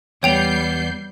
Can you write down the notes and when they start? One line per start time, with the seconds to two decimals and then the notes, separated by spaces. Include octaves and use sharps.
0.23 E2 G3 B3 C#5 G5 G6 C7 F7